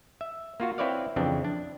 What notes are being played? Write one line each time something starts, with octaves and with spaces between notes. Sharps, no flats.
E5
A#3 F4 F#4
C4 E4 B4 C#5 D5 F5
F2 C#3 E3 C4 D4
D4